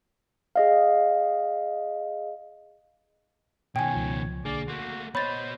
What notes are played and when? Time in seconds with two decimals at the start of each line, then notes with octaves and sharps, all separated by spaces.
0.56 G#4 D#5 F5
3.76 B2 D#3 C#5 G5 G#5
3.94 C#2 F3
4.45 B1 D3 A#3 G#4 D5
4.68 A3 A#3 F#4 C6
5.15 B3 C5 C#5 D#5 B5 A6